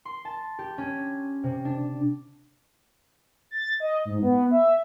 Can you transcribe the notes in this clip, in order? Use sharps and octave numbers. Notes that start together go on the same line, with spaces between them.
C6
A5
G4
C#4
C3
D4
A6
D#5
G#2
B3
E5